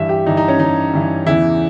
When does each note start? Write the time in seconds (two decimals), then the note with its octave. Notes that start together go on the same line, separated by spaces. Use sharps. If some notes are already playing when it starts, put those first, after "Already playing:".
Already playing: G2 E3 E5
0.09 G4
0.26 G2 E3 D#4
0.37 D#4
0.48 C#4
0.59 G2 E3 D#4
0.93 G2 E3
1.27 E2 C#3 E3 E4